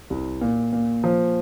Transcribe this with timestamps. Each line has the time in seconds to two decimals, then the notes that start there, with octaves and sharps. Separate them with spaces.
0.10 C2
0.42 A#2
0.73 A#2
1.04 F3